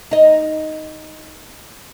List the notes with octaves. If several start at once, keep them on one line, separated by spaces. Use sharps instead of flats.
D#4 D#5